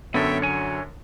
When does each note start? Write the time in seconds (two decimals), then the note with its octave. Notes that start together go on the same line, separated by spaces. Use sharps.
0.14 F#2 D3 B3 A4 C#5 E5 G5
0.42 F#3 C#5 G#5